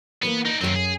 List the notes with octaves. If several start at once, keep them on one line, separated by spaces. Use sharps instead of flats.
E3 G3 A#3 B3
D#4 D5
F#2 D#3 C4 F#4 G#5
G#4